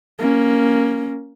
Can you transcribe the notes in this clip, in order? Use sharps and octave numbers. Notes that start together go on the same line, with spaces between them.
A#3 C#4